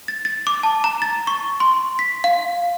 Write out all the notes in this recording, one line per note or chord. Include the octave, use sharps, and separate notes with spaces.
A6
A6
D6
A5
A#5
A6
C#6
C6
B6
F5